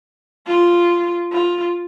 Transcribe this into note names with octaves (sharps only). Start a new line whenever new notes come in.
F4
F4